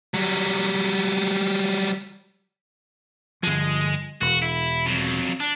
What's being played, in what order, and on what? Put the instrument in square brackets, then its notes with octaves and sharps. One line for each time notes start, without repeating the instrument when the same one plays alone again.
[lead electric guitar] F#3 G3
[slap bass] G1 F3 [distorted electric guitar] G#3
[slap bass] E1 [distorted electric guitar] F#4
[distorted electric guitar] E4
F2 F#3
D4